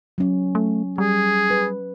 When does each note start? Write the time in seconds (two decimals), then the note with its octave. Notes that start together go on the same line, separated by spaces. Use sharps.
0.18 F#3 C#4
0.55 A3
0.98 G3 G#4
1.50 B4